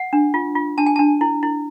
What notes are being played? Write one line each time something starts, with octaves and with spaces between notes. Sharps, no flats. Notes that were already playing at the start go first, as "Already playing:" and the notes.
Already playing: F#5
D4
F4
F4
D4 A5
G#5
D4 A5
E4
E4